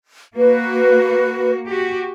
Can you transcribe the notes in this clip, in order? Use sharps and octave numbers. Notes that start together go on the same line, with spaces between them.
A#3 F#4 B4
F#4 G4